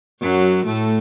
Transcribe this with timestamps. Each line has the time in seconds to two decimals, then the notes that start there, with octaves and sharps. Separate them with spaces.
0.21 F#2 F#3
0.66 A2 A3